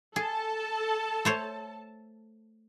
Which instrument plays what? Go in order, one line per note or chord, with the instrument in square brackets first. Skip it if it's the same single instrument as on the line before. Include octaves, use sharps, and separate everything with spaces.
[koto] G#4 [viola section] A4 A5
[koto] A3 C5 C#5